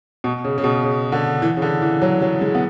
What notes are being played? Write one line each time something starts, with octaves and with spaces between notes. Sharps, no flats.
B2
C#3
C#3
B2
C#3
D3
E3
C#3
D3
E3
F#3
F#3
G#3
B3